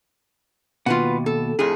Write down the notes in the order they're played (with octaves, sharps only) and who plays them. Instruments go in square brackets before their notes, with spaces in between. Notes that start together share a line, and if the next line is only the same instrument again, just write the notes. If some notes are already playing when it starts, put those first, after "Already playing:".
[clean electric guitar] D#2 B2 [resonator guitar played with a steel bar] F4 B4 F#5
[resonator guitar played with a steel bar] A4
F2 A2 G#4